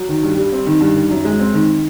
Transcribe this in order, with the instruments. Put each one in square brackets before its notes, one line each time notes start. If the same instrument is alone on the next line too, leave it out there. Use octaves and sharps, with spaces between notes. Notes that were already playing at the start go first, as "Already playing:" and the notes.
Already playing: [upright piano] F#3
D#3
G2
G3
C4
D#3
G2
D#3
F#2
G#3
C4
D#3